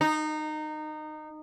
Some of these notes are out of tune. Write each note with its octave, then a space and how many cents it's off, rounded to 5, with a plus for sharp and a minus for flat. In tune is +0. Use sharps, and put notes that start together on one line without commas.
D#4 -20